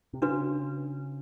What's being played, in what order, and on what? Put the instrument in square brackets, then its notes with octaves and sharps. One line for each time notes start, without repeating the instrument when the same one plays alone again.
[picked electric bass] C3
[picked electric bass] C#3 [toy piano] D4 F#4 B4